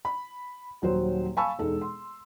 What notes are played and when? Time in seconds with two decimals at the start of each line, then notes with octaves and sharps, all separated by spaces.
0.05 B5
0.82 D#1 F#3 F#4 C5
1.37 F5 G#5 A5 B5 C#6 E6
1.59 E1 G#3 D#4 A4
1.81 C6